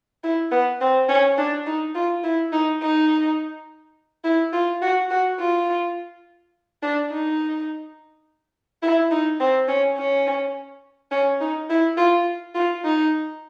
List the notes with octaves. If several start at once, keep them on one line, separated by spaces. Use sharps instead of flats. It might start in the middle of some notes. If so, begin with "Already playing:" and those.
E4
B3
C4
C#4
D4
D#4
F4
E4
D#4
D#4
E4
F4
F#4
F#4
F4
D4
D#4
E4
D#4
C4
C#4
C#4
C#4
D#4
E4
F4
F4
D#4